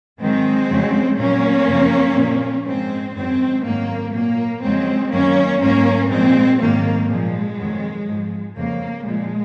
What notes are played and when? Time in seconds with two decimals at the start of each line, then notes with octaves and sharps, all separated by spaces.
0.19 G#2 D#3 F#3 G#3 C4
0.69 F2 C#3 F#3
1.18 A#2 F#3 A#3 C#4
1.67 F#2 C#3 F3
2.16 A#2 F3
2.65 G#2 F3 G#3 C4
3.15 F#2 D#3 F#3 G#3 C4
3.64 G#2 D#3 F#3 A#3
4.13 A#2 F#3 A#3
4.62 F2 C#3 F#3 G#3 C4
5.11 F#2 D#3 F#3 A#3 C#4
5.61 G#2 F#3 A#3 C#4
6.10 A#2 F3 G#3 C4
6.60 G#2 D#3 F#3 A#3
7.09 A#2 F3 G#3
7.58 F2 D#3 F#3
8.07 G#2 F3
8.56 F2 C#3 F3 A#3
9.05 A#2 F3 G#3